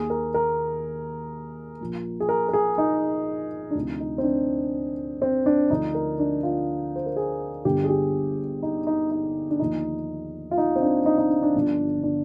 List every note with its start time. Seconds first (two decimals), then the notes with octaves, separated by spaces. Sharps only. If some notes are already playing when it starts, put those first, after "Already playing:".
Already playing: D#2 D#3 G#4
0.10 A#4
0.34 A#4
1.81 A#1 A#2 F3
2.20 G#4
2.29 A#4
2.49 A#4
2.53 G#4
2.78 D#4
3.71 D4
3.75 D2 C3 F3 D#4
4.00 D#4
4.18 C4
4.24 D4
5.22 C4
5.46 D4
5.70 D2 D3 F3 D#4
5.95 A#4
6.19 D4
6.43 F4
6.96 C5
7.06 A#4
7.16 G#4
7.65 G1 G2 D3 G4
7.84 G#4
7.89 G4
8.63 D#4
8.87 D#4
9.11 D#4
9.50 D4
9.59 D#2 D3 F3 D#4
10.51 F4
10.58 D#4
10.76 C4
10.81 D4
11.06 D#4
11.18 D#4
11.30 D4
11.43 D4
11.55 G1 G2 D3 F3
12.03 D4